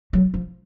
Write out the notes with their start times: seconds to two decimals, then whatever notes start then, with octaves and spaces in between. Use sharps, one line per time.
0.13 F#3
0.34 F3